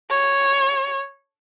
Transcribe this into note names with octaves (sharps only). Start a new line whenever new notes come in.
C#5